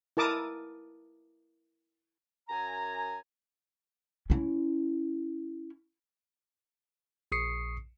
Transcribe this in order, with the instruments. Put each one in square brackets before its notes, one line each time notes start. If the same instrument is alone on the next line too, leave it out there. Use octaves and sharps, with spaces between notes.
[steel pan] E4 A#4 A5 D6 D#6
[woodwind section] F#2 G#5 A#5
[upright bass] C#4 E4
[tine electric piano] A#1 C#6 D#6 C7 C#7